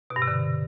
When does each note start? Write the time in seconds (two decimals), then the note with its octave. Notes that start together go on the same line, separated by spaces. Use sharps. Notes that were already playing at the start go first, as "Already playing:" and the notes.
0.10 B2
0.16 G2
0.22 C3
0.28 D3